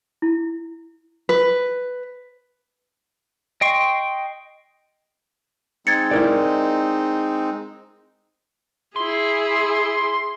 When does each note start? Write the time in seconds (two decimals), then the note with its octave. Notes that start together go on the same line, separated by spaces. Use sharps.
0.22 E4
1.29 B4
3.61 D#5 G5 C6 C#6
5.87 G#3 C4 D#4 G#6 A6 C#7
6.11 E4 A#4 D5
8.96 E4 G#4 C6